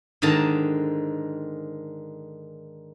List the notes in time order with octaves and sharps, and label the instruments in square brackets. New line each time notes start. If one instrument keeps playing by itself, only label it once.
[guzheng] G#2 D3 D#3 A5 A#5